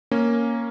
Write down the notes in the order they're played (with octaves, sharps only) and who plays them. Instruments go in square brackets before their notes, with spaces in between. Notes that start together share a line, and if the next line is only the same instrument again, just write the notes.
[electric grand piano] A#3 C#4